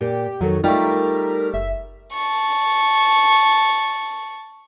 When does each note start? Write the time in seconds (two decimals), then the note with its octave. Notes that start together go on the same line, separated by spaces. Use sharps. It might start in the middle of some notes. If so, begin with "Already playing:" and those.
0.01 A#2 G4
0.41 F2 D#3 F#3 A4 A#4
0.64 G3 A3 D#4 F4 A#4
1.54 F#1 E5
2.13 A5 C#6